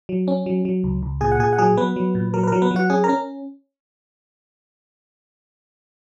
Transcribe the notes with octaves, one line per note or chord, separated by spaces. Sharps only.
F#3
C#4
F#3
F#3
C#2
C#2
A#2 G#4 G#5
F#5
A#2 G#4 G#5
F#5
F#3 G#4 G#5
F#3 B3 B4
F#3
A#2
F#3 A#4
B4
F#3 A#4
B3 B4
F#3
F#4 F#5
C#4 G#4 G#5
A#4 A#5
C#4